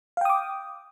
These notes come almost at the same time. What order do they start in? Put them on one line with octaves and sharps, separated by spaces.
F5 G5 D#6 D6